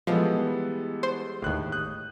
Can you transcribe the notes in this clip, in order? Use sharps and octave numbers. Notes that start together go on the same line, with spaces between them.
E3 F3 G3 G#3 B3 A4
C5
G1 D#2 A2 F#6
D#6 F#6 G6